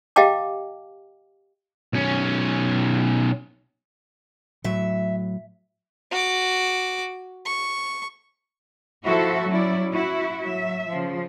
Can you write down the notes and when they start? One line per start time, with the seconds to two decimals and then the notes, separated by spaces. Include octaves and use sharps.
0.16 G4 D#5 F5 G5 A5 D6
1.93 B1 C#4
4.64 A2 F#3 E5
6.11 F#4 D6
7.46 C#6
9.04 F3 E4 F#4 A4 E5
9.48 F#3 C#4 E4 D5
9.91 E4 F#4 E5
10.41 F#3 E5
10.89 C#3 F3